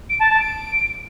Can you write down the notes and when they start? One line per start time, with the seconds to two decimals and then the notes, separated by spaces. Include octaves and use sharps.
0.10 D7
0.20 A5
0.30 A5
0.40 D7